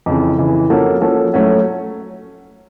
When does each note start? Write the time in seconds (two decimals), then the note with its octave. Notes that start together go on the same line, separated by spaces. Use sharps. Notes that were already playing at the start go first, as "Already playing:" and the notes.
0.06 F2 C#3 E3
0.38 F2 C#3 E3
0.70 F3 A#3 C#4 F#4 A4
1.01 F3 A#3 C#4 F#4 A4
1.33 F#3 A3 C#4 F#4